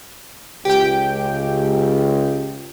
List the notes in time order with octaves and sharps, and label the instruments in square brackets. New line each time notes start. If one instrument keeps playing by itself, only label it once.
[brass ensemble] C#2 [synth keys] G4 G5